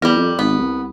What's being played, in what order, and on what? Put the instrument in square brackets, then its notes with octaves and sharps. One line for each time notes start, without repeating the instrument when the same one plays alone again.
[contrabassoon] E2 [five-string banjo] G3 A#4
[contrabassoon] F2
[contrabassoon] G#1 [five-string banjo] B3
[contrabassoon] C2